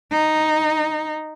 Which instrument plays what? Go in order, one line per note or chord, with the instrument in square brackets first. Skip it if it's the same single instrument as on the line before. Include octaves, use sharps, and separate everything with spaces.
[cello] D#4